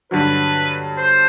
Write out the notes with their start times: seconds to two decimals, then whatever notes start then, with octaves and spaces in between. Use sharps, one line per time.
0.11 G2 D3 F#3 B4
0.97 C5